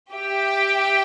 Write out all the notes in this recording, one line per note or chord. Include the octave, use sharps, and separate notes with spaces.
G4 E5 G5